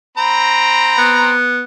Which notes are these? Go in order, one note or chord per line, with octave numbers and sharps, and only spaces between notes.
C4 A#5 B5
B3